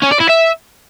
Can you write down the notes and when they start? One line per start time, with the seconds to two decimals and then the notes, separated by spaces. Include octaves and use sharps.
0.03 C#4
0.12 D5
0.21 E4
0.30 E5